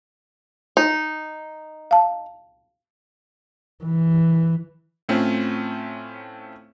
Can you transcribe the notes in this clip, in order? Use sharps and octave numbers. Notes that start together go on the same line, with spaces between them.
D#4
F5 A5
E3
A2 A3 C4 C#4 F4